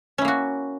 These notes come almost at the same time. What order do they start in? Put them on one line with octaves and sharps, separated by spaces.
C#4 E4 A#3 F#4